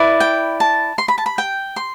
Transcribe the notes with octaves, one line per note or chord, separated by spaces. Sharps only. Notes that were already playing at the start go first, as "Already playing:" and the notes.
Already playing: E4 B4 D5
G5
A5
C6
B5
A5
B5
G5
C6